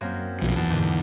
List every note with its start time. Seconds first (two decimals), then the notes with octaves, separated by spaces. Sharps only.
0.01 F#2 A#3 C4
0.42 B1 F3
0.56 E2 A5
0.68 D#2 G#2 D3